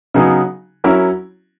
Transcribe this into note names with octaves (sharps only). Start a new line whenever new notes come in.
C#3 F#3 B3 D#4 G#4
F#3 C#4 E4 A#4